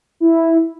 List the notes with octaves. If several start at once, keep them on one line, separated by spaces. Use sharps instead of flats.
E4